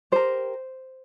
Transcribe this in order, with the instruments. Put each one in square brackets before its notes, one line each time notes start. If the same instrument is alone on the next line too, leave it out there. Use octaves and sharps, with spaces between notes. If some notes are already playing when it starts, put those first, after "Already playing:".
[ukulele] G4 A#4 C5